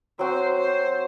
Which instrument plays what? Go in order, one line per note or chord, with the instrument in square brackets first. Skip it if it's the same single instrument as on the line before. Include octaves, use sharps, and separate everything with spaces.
[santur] F#3 C4 F#4 [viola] C5
[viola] C5